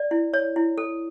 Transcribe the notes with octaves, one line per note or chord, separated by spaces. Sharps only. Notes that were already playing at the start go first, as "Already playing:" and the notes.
Already playing: D5
E4
C#5
E4
A4